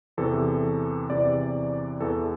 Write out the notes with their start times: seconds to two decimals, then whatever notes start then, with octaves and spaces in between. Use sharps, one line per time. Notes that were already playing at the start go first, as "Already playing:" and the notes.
0.17 E2 C3 E3 A4
1.10 E2 C3 E3 D5
2.00 E2 E3 A4